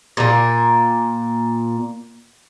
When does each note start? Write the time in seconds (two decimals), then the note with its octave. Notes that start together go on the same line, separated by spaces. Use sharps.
0.17 A#2 A#3